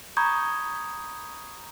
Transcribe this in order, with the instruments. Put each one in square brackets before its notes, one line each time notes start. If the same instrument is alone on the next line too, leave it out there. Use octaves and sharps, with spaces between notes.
[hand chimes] A#5 B5 C#6 D#6 G6 G#6